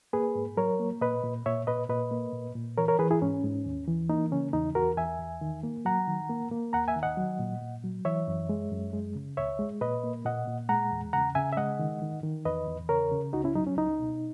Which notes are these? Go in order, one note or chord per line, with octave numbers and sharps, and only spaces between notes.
A#3 G#4 B4
G#2
F#3 A#4 C#5
A#3
A#2 B4 D#5
A#2
A#2 C#5 E5
A#2 B4 D#5
A#2 B4 D#5
A#3
A#2
A#2
E3 A#4 C#5
A#4 C#5
E3 G#4 B4
E4 G#4
G#2 C#4
G#2
D#2
E3
A#3 D#4
C#3 C#4
E2 D#4
E2 F#4 A#4
E2 E5 G#5
E2
D#3
A#3
F#3 F#5 A#5
D#3
A#3
A#3
D#2 F#5 A#5
E5 G#5
D#3
D#5 F#5
F#3
A#2
A#2
F#3
E3 C#5 E5
F#2
G#3
F#2
G#3
C#3
C#2 C#5 E5
G#3
A#2 B4 D#5
A#3
A#2 D#5 F#5
A#2
G#3 F#5 A#5
E2
C#3 F#5 A#5
C#3 E5 G#5
E5
G#3 D#5 F#5
D#3
D#3
D#3
E2 B4 D#5
E2
C#3 A#4 C#5
C#3
C#2 D#4 F#4
C#4 E4
F#3 D#4
C#4
C#2 D#4
B2